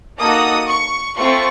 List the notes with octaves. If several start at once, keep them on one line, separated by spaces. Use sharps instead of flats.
A#3 D#4 F#4 A4 D#6
C#6
A3 C4 F4 A4 C#6